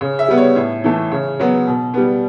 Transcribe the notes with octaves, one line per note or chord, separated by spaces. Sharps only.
C#3
E5
G3 B3
C#5
A2
E3 A3
C#3
F#3 B3
B2
G3 B3